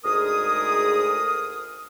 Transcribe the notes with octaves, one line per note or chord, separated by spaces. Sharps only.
D2 G#2 G#4 A#4 D#6